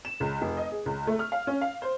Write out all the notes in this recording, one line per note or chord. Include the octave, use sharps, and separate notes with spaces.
E7
C#2
F1
D#5
G#4
C#2
A3
F6
F5
C#4
F5
C5